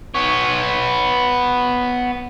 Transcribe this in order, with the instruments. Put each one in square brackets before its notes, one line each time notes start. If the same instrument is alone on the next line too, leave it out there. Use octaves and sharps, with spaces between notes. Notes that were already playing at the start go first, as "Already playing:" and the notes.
[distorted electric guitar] B3 C#5